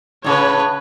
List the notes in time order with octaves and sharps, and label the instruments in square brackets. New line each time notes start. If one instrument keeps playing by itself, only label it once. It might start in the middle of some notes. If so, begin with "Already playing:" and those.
[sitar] A2 C#3 [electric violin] B4 C#5